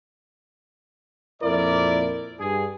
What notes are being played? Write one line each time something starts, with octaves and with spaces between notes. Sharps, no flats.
F2 A#2 E4 A#4 D5
G2 G#4